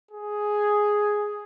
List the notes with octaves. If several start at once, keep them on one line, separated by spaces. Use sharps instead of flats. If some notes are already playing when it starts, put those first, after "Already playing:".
G#4